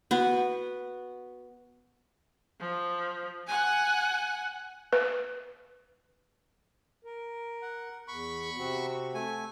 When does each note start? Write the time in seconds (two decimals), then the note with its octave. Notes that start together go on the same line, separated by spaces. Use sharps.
0.11 B3 F#4
2.60 F3
3.47 F#5 G#5
4.93 B4
7.05 A#4
7.62 F#5
8.08 E2 B5 C#6
8.56 C3 C4 F#4
9.14 A3 G#5